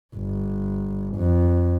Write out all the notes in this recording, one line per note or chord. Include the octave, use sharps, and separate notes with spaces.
G1
F2